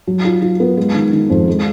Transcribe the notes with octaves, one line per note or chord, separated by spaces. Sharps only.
F#3
F4
F4
B3
G#3
D#3
D#3
F2
G#3